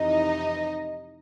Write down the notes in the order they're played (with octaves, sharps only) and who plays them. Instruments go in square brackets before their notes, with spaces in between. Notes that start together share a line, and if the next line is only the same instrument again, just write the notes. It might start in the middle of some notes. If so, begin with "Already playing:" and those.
Already playing: [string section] F2 C3 E3 D#4 D#5